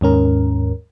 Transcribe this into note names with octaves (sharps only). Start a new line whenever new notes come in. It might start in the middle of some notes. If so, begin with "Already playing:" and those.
D#2 G#2 C#4 A#4